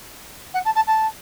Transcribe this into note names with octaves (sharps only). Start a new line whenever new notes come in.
F#5
A5
A5
A5